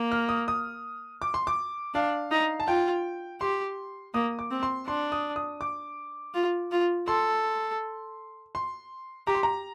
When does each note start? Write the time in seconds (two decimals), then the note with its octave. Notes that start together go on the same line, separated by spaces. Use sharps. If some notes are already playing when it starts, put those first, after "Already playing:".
Already playing: A#3
0.12 F6
0.29 D#6
0.48 D#6
1.22 D6
1.34 C6
1.47 D6
1.94 D4 F5
2.31 D#4
2.60 A5
2.67 F4 G5
3.41 G4 C6
4.14 A#3 D#6
4.39 D6
4.51 C4
4.63 C6
4.87 D4 C6
5.12 D#6
5.36 D#6
5.61 D6
6.34 F4
6.71 F4
7.08 A4 C6
8.55 C6
9.27 G4 A#5
9.35 C6
9.43 A#5